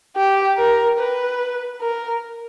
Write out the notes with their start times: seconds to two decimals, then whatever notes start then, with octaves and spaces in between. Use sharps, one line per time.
0.17 G4
0.58 A#4
0.99 B4
1.81 A#4